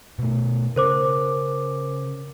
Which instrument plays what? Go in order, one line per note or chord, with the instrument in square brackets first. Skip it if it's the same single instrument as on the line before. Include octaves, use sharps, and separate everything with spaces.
[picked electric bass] B2 A3
[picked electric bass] C#3 [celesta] A#4 C5 D6